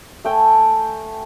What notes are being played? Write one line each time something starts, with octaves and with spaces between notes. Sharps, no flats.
A3 G5 G#5